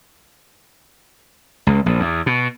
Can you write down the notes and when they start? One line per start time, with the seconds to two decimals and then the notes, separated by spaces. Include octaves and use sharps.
1.67 C#2
1.86 A#1
2.00 E2
2.26 B2